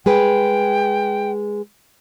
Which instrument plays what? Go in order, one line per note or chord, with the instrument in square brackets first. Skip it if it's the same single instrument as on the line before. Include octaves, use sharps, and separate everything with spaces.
[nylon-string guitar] G#3 G#4 B4 [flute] G5